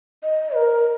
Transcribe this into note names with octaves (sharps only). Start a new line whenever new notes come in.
D#5
A#4